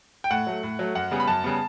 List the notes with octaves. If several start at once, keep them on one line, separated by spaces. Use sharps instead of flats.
G5
A2 F#5
F#3 A3
A2
F#3 A3
F#2 F#5
C#3 G3 B3
B5
F#2 A5
C#3 G3 B3